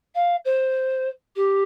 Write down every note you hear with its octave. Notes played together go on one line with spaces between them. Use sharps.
F5
C5
G4